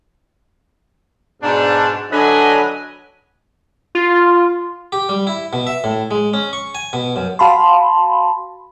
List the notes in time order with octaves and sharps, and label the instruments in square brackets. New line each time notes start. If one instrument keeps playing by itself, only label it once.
[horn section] G#2 B2 D4
D3 F#3 D4 B4 D#5 G#5
[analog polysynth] F4
[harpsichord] G4
G3
E4
B2
E5
A2
G#3
C#4
C#6
G#5
B2
F#2
[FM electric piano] F#4 F5 A5 B5 C6